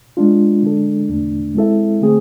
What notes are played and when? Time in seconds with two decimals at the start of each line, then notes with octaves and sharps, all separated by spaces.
0.17 G#3 D4 F4
0.63 D3 G#3 D4 A4
1.09 E2 D3 A3 D4
1.55 G#3 C4 E4 A4 E5
2.01 D3 A3 C4 G#4